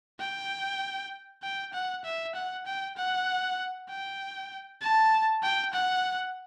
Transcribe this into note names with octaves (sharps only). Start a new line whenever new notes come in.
G5
G5
F#5
E5
F#5
G5
F#5
G5
A5
G5
F#5